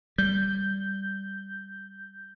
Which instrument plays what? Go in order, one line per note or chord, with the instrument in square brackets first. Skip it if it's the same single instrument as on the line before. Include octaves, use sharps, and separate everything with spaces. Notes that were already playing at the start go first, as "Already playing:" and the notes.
[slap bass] G3 [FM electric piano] G6